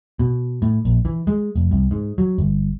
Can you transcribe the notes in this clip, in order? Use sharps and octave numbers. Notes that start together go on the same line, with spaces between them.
B2
A2
A#1
E3
G#3
F1
C2
G#2
F#3
G1